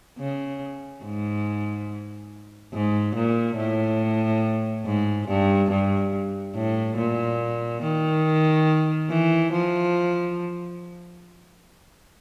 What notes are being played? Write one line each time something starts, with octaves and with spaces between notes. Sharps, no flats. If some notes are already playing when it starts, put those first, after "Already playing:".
C#3
G#2
G#2
A#2
A2
G#2
G2
G2
A2
A#2
D#3
E3
F3